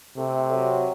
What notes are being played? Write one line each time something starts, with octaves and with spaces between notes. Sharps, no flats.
C3 A3
F#3